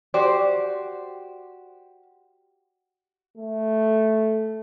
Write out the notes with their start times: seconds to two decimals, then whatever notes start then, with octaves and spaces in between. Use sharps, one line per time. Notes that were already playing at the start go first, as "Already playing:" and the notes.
0.14 F#4 G4 C5 D5
3.37 A3